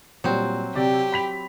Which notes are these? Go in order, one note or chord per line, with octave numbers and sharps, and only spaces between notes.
A#2 F#3 G3 C4
C3 G4 D5
B5 B6 F7